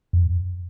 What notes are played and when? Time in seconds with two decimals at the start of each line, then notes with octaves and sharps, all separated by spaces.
0.13 F2